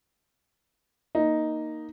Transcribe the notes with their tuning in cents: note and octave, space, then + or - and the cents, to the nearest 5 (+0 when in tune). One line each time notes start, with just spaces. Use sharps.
A#3 +0 D#4 +0